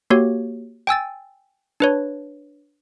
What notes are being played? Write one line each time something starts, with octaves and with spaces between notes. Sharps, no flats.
A#3 F#4 G4 C#5
G5 G#5 E6 A6
D4 B4 C#5